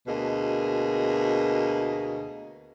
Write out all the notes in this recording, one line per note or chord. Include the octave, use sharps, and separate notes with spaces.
D2 B2 A#3 G#4 D#5